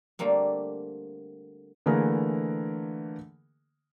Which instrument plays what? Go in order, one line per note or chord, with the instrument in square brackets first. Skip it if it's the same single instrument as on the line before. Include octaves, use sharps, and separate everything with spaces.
[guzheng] D3 G3 A3 A#3 C4
[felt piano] D3 E3 A3 A#3 G#4 A#4